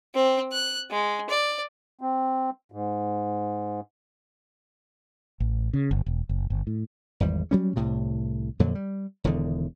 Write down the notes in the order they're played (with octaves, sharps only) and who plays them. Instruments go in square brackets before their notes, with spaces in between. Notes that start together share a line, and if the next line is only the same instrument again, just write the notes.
[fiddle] C4
F#6
G#3
D5
[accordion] C4
G#2
[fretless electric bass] A1
C#3
G1
E1
F#1
G1
A2
[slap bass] G#1 E2 G3
F#3 G3 C#4
C2 A2 C3
F2 A#2 D3 F#3
G3
E1 E2 D3 D#3